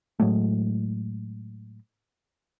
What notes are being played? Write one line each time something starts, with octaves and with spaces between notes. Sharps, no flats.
A2 F#3 G#3 A3